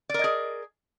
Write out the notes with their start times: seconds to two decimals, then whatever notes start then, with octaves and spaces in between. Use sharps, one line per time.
0.09 D5
0.14 A#4
0.19 D#5
0.24 G#4